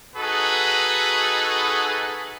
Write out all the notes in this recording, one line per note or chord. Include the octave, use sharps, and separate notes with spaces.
D#4 F#4 G#4 A4 B4